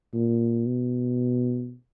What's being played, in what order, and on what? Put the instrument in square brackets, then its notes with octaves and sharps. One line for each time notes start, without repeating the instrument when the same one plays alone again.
[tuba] A#2
B2